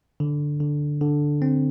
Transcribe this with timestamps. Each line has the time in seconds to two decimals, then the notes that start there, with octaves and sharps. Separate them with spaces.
0.20 D3
0.60 D3
1.01 D3
1.42 C4